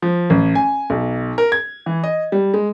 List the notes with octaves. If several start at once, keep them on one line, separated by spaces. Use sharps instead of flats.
F3
A1
G#5
B1
A#4
G#6
E3
D#5
G3
G#3